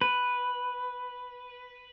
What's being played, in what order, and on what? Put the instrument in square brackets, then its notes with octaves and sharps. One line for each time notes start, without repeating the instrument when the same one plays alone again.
[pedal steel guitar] B4